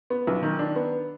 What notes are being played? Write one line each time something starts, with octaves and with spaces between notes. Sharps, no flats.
B3
B1
D#3
D4
B3